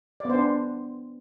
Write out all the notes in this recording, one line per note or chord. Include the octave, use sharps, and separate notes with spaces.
B3 D4 C5 D5